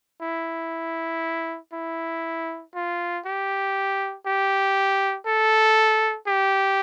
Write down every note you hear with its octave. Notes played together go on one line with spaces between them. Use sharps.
E4
E4
F4
G4
G4
A4
G4